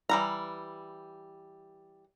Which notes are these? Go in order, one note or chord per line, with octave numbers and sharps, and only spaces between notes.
E3 G3 A#5